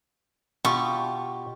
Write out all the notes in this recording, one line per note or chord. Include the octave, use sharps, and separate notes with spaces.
B2 F4 G4 C#6